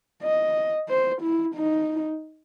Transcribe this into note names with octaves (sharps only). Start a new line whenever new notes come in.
D#5
C5
E4
D#4